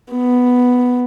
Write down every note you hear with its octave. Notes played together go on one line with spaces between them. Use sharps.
B3